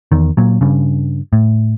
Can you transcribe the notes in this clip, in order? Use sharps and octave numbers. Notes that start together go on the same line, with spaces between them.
E2 D#3
A#2 F#3
G2 C#3
A2